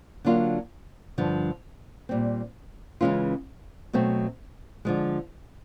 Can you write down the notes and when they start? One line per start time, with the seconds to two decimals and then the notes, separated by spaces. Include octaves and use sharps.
0.25 D3 F#3 A#3 D4 F4
1.18 G2 D3 F3
2.09 A#2 G3 C4
3.01 C#3 E3 G#3 C#4 F4
3.93 B2 F#3 A3 C4
4.85 D3 F3 G#3